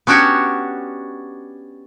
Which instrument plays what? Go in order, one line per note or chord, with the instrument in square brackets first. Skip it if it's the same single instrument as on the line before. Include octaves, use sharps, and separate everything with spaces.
[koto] B3 C#4 D4 F#4 G4 C#5